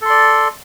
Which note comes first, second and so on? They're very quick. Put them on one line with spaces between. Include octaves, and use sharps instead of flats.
A4 C6 D5